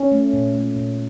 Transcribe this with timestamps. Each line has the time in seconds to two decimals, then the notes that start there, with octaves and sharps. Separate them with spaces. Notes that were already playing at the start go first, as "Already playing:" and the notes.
Already playing: C#4
0.12 A3
0.33 A#2
0.55 A3
0.76 A#2